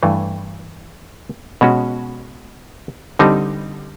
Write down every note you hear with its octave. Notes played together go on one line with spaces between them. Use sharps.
G2 E3 A3
B2 G#3 C#4 F#4
D3 G3 C4 D#4